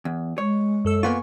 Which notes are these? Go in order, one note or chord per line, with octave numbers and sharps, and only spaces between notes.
E2
G#3 C#5
F#2 A4 E6
A#3 B3 F4 G#5 C#6